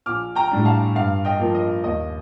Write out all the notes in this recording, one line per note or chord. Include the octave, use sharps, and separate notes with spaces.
A#1 D6 F6
G5 A#5
A2 G3 D4
F5 A5
G2 F5
D#5 G5
F3 A#3
D#5
D#2 D#5